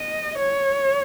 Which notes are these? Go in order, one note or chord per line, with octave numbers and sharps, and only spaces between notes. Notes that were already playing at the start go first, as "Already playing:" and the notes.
Already playing: D#5
C#5